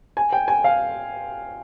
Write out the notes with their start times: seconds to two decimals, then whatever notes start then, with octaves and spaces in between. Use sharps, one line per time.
0.17 G#5
0.33 G5
0.48 G#5
0.64 F5